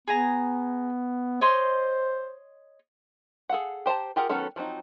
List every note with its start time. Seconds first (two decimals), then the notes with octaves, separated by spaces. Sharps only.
0.08 B3 G#4 G#5 A#5
1.41 C5 C#5 D#5 C6
3.49 G#4 A4 F5 F#5
3.86 G4 C5 F#5 A5 A#5
4.16 F4 G4 G#4 A#4 F#5
4.29 D#3 F#3 B3 C#4 A4
4.56 F3 F#3 C4 D#4